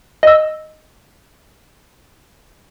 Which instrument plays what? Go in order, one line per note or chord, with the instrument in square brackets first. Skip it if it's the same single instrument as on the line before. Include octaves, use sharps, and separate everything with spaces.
[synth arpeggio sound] D#5 E6